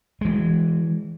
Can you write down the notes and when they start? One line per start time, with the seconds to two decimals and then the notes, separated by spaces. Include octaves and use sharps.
0.21 E3 G#3